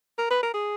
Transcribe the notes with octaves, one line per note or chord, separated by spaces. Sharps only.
A#4
B4
A#4
G#4